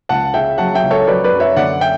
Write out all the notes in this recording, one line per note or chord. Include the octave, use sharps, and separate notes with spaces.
C#2 F#5 A5
C#3 E5 G5
F#3 F#5 A5
E5 G5
C#2
A4 C#5
F#3 B4 D5
B4 D5
F#2
C#5 E5
D3 D5 F#5
E5 G5